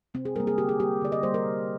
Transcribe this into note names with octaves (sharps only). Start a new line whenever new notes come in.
C3 C4
G#4
G3 A#3 A#4
G#4
D3 G4
G#4
G3 A#3 G4
D3 D5
D#5
G3 A#3 C5
A#4
C3